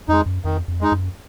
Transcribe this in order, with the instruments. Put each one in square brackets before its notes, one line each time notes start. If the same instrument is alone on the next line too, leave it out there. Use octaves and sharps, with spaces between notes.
[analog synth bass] F2 [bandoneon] G#3 D#4
[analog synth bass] F#2
[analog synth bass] F2 [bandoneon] D#3
[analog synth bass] F2
[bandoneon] G#3 D#4
[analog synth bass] F#2